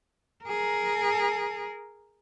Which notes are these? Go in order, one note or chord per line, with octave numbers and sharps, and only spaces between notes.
G#4 A#4